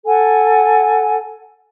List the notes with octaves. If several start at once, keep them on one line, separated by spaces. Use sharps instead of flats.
A4 F#5 G#5